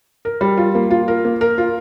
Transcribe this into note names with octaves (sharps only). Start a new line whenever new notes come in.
A#4
G3
F4
A#3
F4
A#4
A#3
A#4
F4